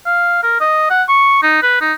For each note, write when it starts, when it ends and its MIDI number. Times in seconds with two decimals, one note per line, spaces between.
0.06 0.41 77
0.43 0.58 70
0.61 0.89 75
0.90 1.03 78
1.09 1.43 85
1.43 1.59 63
1.62 1.77 71
1.81 1.93 63